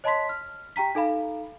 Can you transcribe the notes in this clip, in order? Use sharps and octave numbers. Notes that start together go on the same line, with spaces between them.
C#5 D#5 A5 B5 C6 B6
F6
G4 G5 A#5 B6
D#4 A4 F5 B5